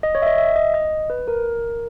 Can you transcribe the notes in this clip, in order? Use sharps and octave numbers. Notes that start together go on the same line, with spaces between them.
D#5
C#5
E5
D#5
E5
D#5
D#5
B4
A#4